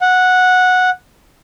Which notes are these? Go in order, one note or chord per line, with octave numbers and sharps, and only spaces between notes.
F#5